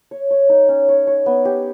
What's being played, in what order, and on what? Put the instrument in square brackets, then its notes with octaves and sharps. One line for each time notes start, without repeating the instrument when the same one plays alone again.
[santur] C#5
C#5
D#4
C#4
C#5
C#5
B3
G4